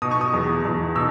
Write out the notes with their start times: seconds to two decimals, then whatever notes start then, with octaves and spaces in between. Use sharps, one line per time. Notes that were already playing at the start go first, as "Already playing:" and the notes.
0.02 B2 D#6
0.11 C#6
0.21 D#6
0.33 E2
0.65 E2
0.96 B2 E6